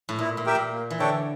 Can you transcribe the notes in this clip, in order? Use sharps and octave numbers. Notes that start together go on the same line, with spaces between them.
A2
A#2 E4
A#2
G4 A#4 E5 G5
A#2
A#3
E3
D3 D4 A4 C#5 G5